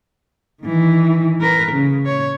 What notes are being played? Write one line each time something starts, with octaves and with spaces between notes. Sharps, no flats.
D#3 E3
A#4 B4
C#3
C#5